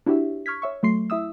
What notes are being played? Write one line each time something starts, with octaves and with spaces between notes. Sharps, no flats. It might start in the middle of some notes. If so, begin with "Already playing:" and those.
D4 E4 F#4 G4 C#5 E5
C#6 F6 G#6 B6
C#5 E5 C#6
F#3 A3 C6 C7
E4 E5 D#6 E6